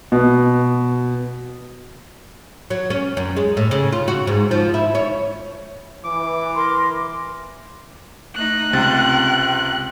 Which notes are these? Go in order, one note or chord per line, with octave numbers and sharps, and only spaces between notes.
B2
F#3
C#4
F#2
G#3
A2
C#3
F4
F#4
G#2
F3
E4
C#5
E3 D6
A#4 C6
A3 D#4 F#6
C#2 C3 G5 A6